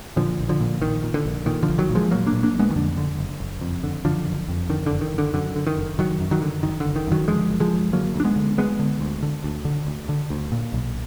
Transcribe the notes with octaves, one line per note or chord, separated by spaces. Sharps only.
A#2 D3 F3
A#1
D3 F3
A#2
A#1 D#3
A#2
D3
A#1
A#2 D#3
D3 F3
A#1
D#3 F#3
A#2
F3 G#3
A#1 F#3 A#3
A#3 D4
A#2
A#3 D4
A#1
G#3 B3
D#3
F2 D3
D3
F#1
F#1
F2
D3
F#1 D3 F3
F#1
F2
D3 D#3
F#1 D3
D#3
F#1
D3
F#2 D3
D3
D#3
F#1
F#1 D#3 F#3
F#2
D#3 F#3
D3
F#1 D#3
F#1 D3
D#3
F#2 D#3 F#3
D3 F3 G#3
F#1
F3 G#3
F#1
D3 F#3 A#3
D2
D4
G#3 B3
D3
D2 G#3 B3
D3
D2
D3
D2
D3
D2
D3
D2
A#2
B1